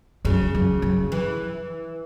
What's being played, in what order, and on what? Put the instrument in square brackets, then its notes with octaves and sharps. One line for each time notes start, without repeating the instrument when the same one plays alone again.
[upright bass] F#2 [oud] C#3
[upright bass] F#2
F#2
[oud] E3